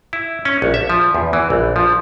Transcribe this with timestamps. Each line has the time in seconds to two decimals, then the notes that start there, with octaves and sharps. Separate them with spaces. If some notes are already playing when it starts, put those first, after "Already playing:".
0.13 E4
0.45 C#4
0.62 A#1
0.74 E5
0.90 F3
1.14 E2
1.33 E3
1.50 A#1
1.76 F3